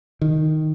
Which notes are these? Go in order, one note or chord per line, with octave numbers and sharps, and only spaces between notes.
D#3